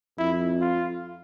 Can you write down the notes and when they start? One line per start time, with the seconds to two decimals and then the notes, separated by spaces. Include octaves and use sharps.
0.18 F2 E4
0.61 F4